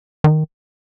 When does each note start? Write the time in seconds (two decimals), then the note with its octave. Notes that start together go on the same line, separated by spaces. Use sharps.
0.24 D#3